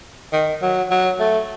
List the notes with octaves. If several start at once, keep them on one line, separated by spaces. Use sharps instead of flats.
D#3
F#3
F#3
A3